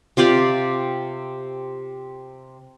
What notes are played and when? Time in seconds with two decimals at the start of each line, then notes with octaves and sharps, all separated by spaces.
0.17 C3 F4 G4 D5